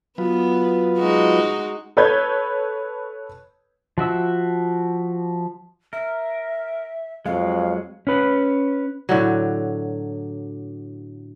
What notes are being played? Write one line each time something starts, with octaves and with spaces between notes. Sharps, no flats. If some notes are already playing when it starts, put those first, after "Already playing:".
F#3 B3 F4 B4
G#3 D#4 F#4
A4 B4 C#5 G6 G#6
F3 F#4 E5 E6
A#4 E5
F2 F#3 G#3 F5
C#4 B4
A2 D3 F#3